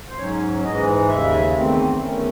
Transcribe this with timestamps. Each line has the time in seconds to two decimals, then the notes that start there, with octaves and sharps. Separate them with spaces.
0.09 C5
0.18 G#2 F#3 C#4 C#5
0.64 G#2 E3 G#3 D#5
1.09 D#2 C#3 G#3 E5
1.55 E2 D#3 A3 C4
2.00 E2 D#3 A3 C#4